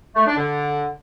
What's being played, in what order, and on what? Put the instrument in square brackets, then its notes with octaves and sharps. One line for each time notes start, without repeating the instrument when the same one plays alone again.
[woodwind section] A3
D4
D3